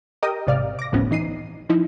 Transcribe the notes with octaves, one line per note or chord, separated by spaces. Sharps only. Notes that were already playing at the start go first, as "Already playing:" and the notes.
G4 A#4 D#5 G5 D#6
G#1 C3 D5 F5 F6
D6 A#6
G1 D2 A2 F3 B3 C#4
E3 D#4 C7 D#7
F3 D#4 E4